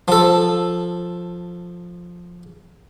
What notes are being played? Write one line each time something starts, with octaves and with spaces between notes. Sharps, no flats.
F3 A4